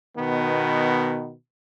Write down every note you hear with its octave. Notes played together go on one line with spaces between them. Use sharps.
B2 D#3 B3